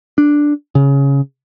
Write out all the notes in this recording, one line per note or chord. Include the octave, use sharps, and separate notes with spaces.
D4
C#3